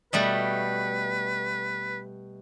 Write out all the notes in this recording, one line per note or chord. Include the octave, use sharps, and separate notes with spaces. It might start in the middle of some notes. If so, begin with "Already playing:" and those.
B2 G3 A3 B4